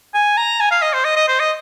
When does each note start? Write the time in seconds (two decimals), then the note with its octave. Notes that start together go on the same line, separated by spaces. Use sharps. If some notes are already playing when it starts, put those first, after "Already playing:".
0.14 G#5
0.37 A#5
0.60 G#5
0.71 F5
0.82 D#5
0.93 C5
1.04 D#5
1.16 D#5
1.28 C5
1.40 D#5